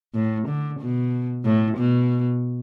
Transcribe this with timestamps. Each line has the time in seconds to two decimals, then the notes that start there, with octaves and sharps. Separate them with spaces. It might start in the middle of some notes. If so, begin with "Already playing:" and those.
0.15 A2
0.48 D3
0.80 B2
1.45 A2
1.77 B2